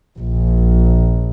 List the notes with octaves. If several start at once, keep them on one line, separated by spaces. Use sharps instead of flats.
A#1